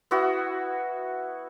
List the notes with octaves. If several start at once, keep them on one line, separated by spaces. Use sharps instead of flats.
B3 E4 F#4